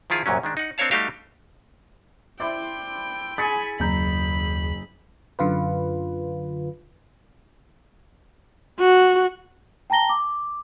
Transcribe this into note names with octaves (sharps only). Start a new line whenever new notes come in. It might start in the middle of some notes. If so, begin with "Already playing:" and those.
D#3 F3 E4 F4 G#4
C2 F#2 A#2 F#3 C#4
D#3 G#3 D4
D#4 F#5
C4 D4 A#4 C#5 F5 A5
G3 A3 D#4 F#4 G4 F5
E4 C5 D5 E5 G5
G#4 G#5 B5 C#6 A6 B6 C#7
F#1 D#2 A#5 B5 G6
F#2 D3 F4 B4
F#4
G5 A5 A#5 A#6 G7
D6